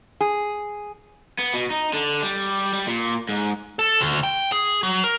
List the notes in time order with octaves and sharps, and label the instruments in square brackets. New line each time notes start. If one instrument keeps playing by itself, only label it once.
[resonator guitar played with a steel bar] G#4
[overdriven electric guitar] B3
B2
D#4
D3
G3
G3
A#2
G#2
[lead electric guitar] A4
D2
G5
G#4
F#3
A#4